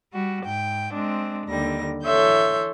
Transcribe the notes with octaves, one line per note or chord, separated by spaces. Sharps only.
G3 F#4
G#2 G5
G#3 C4 D4
D#2 D3 G3 A#6
E3 A4 C#5 E5 C6 G6